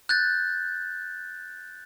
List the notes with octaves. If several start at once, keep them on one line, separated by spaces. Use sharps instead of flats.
F#6 G6 A6